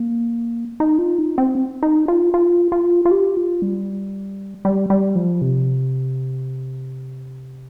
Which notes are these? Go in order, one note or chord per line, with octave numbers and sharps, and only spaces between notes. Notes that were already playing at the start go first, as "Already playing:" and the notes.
Already playing: A#3
D#4
F4
D#4
C4
D#4
F4
F4
F4
F4
G4
F4
G3
G3
G3
F3
C3